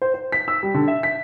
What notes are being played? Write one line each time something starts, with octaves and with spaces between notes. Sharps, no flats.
C5
C5
B6
E6
G3
D3
E5
B6